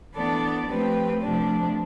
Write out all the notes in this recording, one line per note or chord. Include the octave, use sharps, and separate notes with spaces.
E3 B3 D4 A4 D5
F3 A3 C4 G4 B4
F2 C3 F3 A3 D4